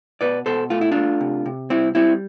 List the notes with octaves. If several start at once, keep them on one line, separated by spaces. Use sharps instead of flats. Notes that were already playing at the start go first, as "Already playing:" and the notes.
B2 B4 D5
B2 A4 C5
A3 F4
E4
A3 D4 F4
C3
C3
G3 C4 E4
G3 C4 E4